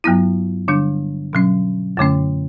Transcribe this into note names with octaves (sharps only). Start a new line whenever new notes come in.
G2 F#3 B3 E4
D3 G3 D4
B2 F#3 C#4
F#2 D3 A3 C#4